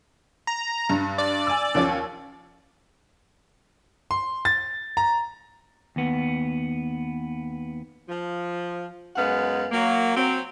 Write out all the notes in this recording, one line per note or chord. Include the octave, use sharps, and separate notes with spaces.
A#5
G2
D5
G#5 E6
D#2 F3 C#4
C6
A6
A#5
D#2 B3
F3
F#2 G#3 B3 F5 F#5
F#3 A#3
F#3 C4